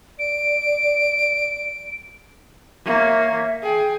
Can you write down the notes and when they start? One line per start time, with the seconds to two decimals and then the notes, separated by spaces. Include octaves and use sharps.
0.19 D5 D7
2.85 A#3 C#5 E5
3.63 G#4 G5